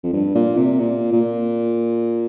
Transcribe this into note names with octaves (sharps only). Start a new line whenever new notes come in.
F2
G2
A#2
C3
A#2
A#2